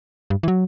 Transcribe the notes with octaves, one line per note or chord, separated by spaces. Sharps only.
G2
E3
F#3